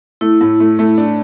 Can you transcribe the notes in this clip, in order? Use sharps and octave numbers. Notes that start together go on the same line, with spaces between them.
A3 E4
A2
A3
A3
D4